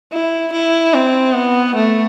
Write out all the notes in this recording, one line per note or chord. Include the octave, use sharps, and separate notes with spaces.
E4
E4
C4
B3
A3